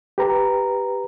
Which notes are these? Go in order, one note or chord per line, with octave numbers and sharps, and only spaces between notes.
G4 B4 A#5